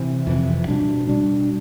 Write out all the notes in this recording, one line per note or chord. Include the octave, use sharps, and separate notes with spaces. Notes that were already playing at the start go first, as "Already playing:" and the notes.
Already playing: C3 E3
F2 C3 E3
B2 G3 D4
B2 G3 D4